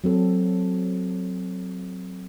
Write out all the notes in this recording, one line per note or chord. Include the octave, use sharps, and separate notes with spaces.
F#3 C4 A4